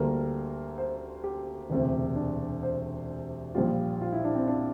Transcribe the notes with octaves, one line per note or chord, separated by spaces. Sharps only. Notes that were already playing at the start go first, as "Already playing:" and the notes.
Already playing: D2 D3 G3 A#3 A#4
C5
G4
E1 D2 C3
D4
C5
A#1 A#2 G3 F4
F4
E4
D4
C4
D4